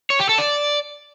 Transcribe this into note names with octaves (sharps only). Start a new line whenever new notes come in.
C#5
G4
A4
D5